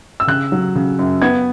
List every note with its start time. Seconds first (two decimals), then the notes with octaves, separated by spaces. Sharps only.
0.20 E6
0.27 C#3 F#6
0.52 F#3
0.75 C#3
0.99 F#2
1.22 B3 G#6